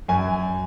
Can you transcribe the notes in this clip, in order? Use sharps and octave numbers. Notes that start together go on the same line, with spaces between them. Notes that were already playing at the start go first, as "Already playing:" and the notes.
F#2 G#5